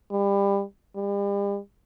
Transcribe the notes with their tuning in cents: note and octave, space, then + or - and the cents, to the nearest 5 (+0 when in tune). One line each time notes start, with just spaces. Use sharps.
G3 +25
G3 +40